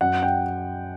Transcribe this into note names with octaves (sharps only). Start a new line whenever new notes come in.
F#2 F#5
G5